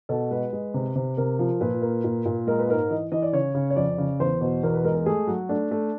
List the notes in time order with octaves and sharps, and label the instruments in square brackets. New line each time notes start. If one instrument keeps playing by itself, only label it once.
[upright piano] B2 A4
G#3 B4
G#3
C3
C3
C3 A#4
F3
A#2 B4
A#3
A#2
A#2
G#3 A#4
B4
G#2 A#4
E3 D#5
E3 D#5
D5
C#3 C#5
C#3
C#5
F2 D5
C#3
E2 C5
B2
E2 A#4
B4
G#3 A#4
A#4
A3 G#4
F#3 F#4
A3 D4
A3